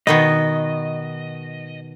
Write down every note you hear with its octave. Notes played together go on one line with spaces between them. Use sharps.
B2 D#3 B3 D#5